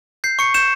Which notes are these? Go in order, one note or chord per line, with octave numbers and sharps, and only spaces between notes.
G6 C7
C#6 C#7
G6 E7